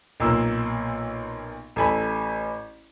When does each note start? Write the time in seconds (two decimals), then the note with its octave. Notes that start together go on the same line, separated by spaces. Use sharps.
0.20 B1 A#2 A#3 E6
1.76 A1 A4 G#5 B5